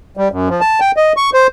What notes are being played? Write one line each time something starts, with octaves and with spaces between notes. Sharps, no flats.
G3
F#2
F3
A5
G5
D#5
C#6
C5